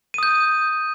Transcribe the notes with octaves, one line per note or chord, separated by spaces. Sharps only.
D#6 G6 D#7